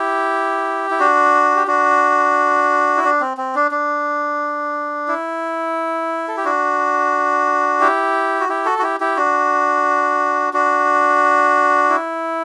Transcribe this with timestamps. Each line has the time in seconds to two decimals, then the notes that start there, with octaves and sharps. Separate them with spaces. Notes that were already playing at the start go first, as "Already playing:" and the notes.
Already playing: E4 G4
0.91 E4
0.99 D4 F#4
1.56 G4
1.67 D4 F#4
2.97 E4
3.04 D4
3.21 C4
3.37 C4
3.55 D4
3.71 D4
5.08 E4
6.28 A4
6.37 G4
6.45 D4 F#4
7.80 E4 G4
8.40 F#4
8.49 E4 G4
8.65 F#4 A4
8.79 F#4
8.82 E4 G4
9.00 E4 G4
9.16 D4 F#4
10.53 D4 F#4
11.90 E4